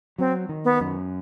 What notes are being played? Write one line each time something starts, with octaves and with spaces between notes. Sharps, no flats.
F#3 C4
D#3
B3
F#2